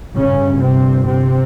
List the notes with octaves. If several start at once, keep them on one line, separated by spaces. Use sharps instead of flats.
G1 G2 C#3 C#4
C3 C4
C3 C4